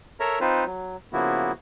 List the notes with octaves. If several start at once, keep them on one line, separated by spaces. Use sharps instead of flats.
A4 A#4 C#5 E5 A#5
C4 D#4 F4 B4 C5
F#3
C#3 F3 A#3 B3 E4 F#4